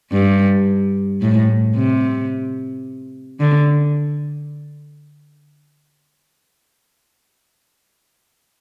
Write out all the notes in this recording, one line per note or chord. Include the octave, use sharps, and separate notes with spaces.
G2
A2
C3
D3